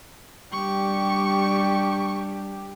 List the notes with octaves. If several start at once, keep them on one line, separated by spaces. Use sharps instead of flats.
G3 D4 G4 C#6